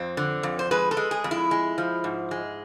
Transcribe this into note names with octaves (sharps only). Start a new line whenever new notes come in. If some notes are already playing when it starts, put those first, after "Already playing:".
Already playing: F2 C4
D3
F2
C5
G#3 B4
A4
G#3
G#4
F2
E4
G#3
F3
G#2
G#3